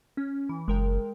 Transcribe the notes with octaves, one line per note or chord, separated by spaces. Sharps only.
C#4
E3
F#1 G#3 A#4 G5